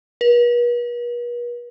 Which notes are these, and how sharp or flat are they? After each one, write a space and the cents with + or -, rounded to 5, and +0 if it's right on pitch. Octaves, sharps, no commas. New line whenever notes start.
B4 -45